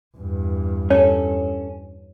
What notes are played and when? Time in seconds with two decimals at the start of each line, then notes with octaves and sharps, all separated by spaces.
0.17 E2 G2
0.90 C#4 A4 C#5